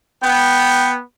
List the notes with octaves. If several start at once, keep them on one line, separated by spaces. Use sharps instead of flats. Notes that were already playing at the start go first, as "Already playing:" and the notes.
B3 G5